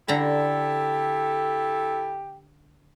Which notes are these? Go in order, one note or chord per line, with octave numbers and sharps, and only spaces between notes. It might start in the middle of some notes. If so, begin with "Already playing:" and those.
D3 E4 G4 A4 A#5 B5